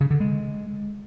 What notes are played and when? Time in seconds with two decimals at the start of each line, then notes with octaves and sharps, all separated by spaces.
0.01 C#3
0.10 D3
0.20 G#3